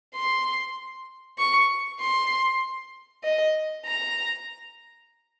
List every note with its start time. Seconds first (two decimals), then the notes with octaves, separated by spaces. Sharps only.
0.15 C6
1.38 C#6
2.01 C6
3.24 D#5
3.86 A#5